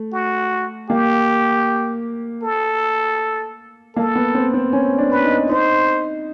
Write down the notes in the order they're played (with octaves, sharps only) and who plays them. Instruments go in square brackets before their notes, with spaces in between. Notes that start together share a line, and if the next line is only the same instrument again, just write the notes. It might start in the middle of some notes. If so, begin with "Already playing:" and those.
Already playing: [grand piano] A3
[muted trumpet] F#4
[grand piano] A#3 [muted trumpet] G4
[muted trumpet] A4
[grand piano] A#3 [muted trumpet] A4
[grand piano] B3
C4
C4
C#4
D4
[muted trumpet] B4
[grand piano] D#4
[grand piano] D#4 [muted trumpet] C5